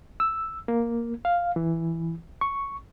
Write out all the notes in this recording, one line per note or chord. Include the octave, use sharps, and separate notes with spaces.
E6
A#3
F5
E3
C#6